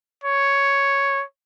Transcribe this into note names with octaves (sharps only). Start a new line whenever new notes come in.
C#5